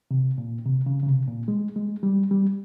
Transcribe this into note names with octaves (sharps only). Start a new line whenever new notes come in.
C3
A#2
C3
C#3
C#3
C3
A#2
G#3
G#3
G3
G3